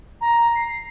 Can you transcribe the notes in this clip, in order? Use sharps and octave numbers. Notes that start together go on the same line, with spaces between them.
A#5
C7